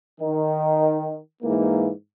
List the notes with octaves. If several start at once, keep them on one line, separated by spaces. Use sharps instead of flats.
D#3
G#2 E3 A#3